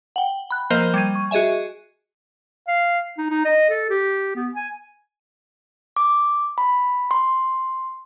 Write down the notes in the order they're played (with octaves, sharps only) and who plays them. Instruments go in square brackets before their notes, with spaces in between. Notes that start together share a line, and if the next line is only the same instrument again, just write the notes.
[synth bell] F#5 G5
B5 F#6
F3 A#3 A#4 C5 D#5 G6
G3 G#6 D#7
C#6
F#4 G#4 D#5 E5 G#5
[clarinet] F5
D#4
D#4
D#5
A4
G4
B3
G#5
[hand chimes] D6
B5
C6